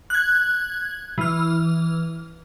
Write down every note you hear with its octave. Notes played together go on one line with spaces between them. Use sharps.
F#6 G#6
E3 F6